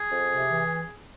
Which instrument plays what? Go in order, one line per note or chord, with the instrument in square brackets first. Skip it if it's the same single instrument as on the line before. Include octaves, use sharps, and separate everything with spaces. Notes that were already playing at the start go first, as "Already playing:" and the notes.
Already playing: [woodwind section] G#4
F2
C3
E3